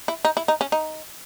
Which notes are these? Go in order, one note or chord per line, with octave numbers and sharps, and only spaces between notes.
E4
D#4
E4
D#4
C#4
D#4